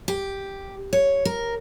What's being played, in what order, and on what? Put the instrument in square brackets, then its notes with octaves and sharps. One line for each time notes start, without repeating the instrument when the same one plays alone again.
[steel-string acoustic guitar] G4
C#5
A#4